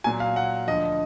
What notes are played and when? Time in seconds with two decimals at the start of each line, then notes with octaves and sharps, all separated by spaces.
0.04 A#2 F#3 G#5
0.20 F5
0.36 F#5
0.67 D2 D3 F3 D#5